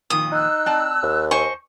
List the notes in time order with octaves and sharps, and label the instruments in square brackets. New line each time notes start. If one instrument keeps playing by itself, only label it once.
[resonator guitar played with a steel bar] F2 A#2 D#3 [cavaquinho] D#6
[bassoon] D#4 [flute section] E6 F#6
[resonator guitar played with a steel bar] C4 D5 A5
[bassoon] D#2
[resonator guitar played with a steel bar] C5 D#5 G#5 [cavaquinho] C#6